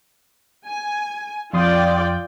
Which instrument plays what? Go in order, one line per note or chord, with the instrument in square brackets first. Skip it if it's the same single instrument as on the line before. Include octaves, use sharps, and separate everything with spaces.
[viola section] G#5
[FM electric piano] F2 C6 D#6 [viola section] F4 D5 G5